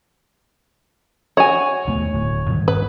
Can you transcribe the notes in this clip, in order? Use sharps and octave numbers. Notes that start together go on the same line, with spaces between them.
F#4 C#5 G#5
D#2 A3 B3
D1
G2 D#3 G3
B4